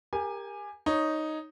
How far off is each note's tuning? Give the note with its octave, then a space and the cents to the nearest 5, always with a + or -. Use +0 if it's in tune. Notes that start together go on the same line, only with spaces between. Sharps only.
G4 +25 A#4 +0 G#5 -5
D#4 +0 C#5 +0